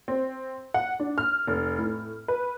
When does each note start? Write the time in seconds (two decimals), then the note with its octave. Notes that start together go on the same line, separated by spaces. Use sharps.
0.08 C4
0.74 F#5
1.00 D4
1.18 F6
1.47 F1
1.79 A2
2.28 B4